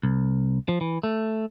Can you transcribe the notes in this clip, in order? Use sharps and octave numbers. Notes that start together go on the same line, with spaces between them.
C2
F3
E3
A3